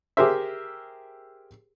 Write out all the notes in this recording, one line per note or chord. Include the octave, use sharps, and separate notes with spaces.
G4 G#4 A#4 C5 E5